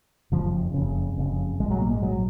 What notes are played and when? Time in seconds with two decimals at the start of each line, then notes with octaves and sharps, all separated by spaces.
0.32 F#1 F2 C#3 F3
0.74 F#1 F2 C#3
1.18 F#1 F2 C#3
1.60 A#1 G#3
1.64 G#2
1.71 F#3
1.81 A#3
1.91 G#3
2.02 A#1 G#2 F#3